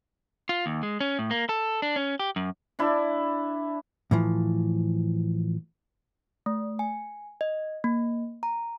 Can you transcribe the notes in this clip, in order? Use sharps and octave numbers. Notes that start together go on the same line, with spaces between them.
F4
D#2
G#3
C#4
A2
A#3
A4
D4
C#4
G4
F#2
D4 E4
A2 E3 F3
A3
G#5
D#5
A#3
A#5